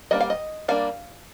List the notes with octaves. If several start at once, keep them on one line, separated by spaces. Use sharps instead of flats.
G3 A#3 D4 D#5
F5
D#5
G3 A#3 D4 F5